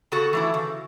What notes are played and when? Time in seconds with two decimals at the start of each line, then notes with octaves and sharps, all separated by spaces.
0.12 C#3 F#4 A4
0.33 E3 A3 E4
0.54 C#3